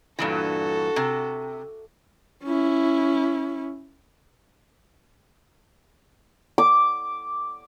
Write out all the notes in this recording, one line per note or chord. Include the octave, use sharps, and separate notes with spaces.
G2 A#2 E3 F#4 A4
C3
C#4 E4
D6